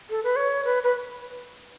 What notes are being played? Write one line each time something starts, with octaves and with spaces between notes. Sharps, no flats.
A4
B4
C#5
B4
B4